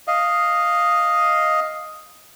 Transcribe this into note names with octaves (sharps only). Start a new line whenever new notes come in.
D#5 F5